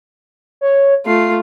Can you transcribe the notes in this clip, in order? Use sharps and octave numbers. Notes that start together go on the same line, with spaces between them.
C#5
A3 F4 C7